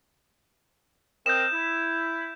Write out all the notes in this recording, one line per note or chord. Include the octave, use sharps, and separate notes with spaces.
C4 A#4 D#5 G6 E7
E4